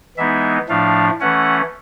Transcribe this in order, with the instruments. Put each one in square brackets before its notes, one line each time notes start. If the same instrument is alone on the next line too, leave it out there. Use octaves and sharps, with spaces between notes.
[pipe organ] E3 G#3 B3 D#4 E5
A2 F3 A3 D4 F5
E3 A3 C#4 F#5